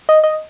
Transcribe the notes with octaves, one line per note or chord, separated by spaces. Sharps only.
D#5
D#5